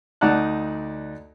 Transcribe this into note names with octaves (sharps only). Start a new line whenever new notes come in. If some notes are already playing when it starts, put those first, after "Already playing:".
D2 D#4 D5 F#5 A5 F#6